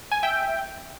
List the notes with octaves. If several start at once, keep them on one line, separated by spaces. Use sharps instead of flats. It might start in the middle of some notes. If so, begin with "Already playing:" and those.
G#5
E5 G5